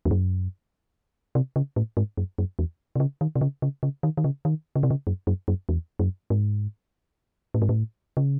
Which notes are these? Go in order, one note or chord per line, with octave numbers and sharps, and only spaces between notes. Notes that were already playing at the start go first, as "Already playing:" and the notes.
E2
F#2
C3
C#3
A2
G#2
F#2
F#2
E2
C3
C#3
D#3
C3
C#3
C#3
C#3
D#3
D#3
C#3
D#3
C#3
C3
C#3
F#2
F#2
F#2
E2
F#2
G#2
A2
G#2
A2
C#3